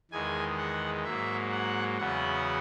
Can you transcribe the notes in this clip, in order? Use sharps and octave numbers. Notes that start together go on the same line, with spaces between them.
E2 D#3 G#3 G#5
F#5
G#2 F#3 A#3 E5
F#5
E2 C#3 F#3 B3 F#5